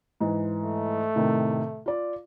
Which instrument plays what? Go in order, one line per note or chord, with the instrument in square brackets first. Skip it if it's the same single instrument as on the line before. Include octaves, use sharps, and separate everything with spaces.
[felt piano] G#2 E3
[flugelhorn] A3
[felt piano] A2 C3 D#3
F4 D5